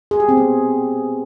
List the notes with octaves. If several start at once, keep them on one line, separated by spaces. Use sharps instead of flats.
G#4
G4
C4
B3